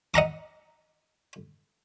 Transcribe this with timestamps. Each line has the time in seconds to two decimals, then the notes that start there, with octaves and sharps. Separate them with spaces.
0.14 D#5 F#5 A#5 D6